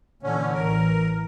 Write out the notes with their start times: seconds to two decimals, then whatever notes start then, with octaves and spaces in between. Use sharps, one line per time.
0.23 A#2 D3 E3 C#4
0.54 A1 E3 A#4